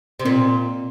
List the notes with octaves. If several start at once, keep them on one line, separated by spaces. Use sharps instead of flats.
C3
A#2 C4